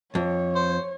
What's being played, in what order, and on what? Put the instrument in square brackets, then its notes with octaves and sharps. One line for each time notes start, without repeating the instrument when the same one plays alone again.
[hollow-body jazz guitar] F2 [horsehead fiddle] C#5
[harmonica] C5